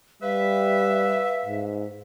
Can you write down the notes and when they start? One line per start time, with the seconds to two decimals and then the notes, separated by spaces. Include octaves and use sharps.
0.23 G3 B4 E5 F5
1.46 G#2